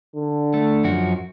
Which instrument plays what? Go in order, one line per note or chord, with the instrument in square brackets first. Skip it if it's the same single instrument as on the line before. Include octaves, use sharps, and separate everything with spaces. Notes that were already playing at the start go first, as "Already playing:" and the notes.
[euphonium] D3
[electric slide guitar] A3
F#2 F3 F#4